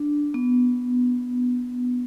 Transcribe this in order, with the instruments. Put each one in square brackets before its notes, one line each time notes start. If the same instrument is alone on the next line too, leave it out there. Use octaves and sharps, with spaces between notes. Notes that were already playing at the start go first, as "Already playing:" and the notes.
Already playing: [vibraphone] D4
B3